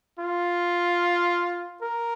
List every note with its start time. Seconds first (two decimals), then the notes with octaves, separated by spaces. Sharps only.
0.19 F4
1.82 A#4